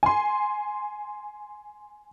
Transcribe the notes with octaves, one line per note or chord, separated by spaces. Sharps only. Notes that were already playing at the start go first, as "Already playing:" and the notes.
G#5 C6